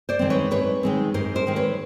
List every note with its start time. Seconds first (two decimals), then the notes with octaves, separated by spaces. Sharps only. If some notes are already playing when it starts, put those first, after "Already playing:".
0.09 C5 D5
0.19 D#3 G#3 C4
0.30 B4 C#5
0.51 G#2 B4 C#5
0.83 D#3 G#3 C4
1.14 G#2 A#4 C5
1.35 A#4 C5
1.47 D#3 G#3 C4
1.56 B4 C#5